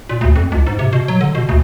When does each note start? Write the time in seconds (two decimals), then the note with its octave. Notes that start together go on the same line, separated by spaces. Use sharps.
0.09 A#2
0.21 D2
0.36 F2
0.52 C#2
0.67 G#2
0.79 C3
0.93 B2
1.08 F#3
1.21 D3
1.35 B2
1.49 D2